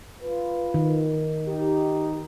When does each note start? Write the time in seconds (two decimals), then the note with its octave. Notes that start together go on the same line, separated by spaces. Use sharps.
0.23 F4 B4
0.74 D#3
1.47 D#4 G4